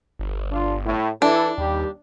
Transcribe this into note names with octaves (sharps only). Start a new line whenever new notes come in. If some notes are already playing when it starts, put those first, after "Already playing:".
G1
D4 F4
A2
E3 D4 E4 A4
D#2 G3 G4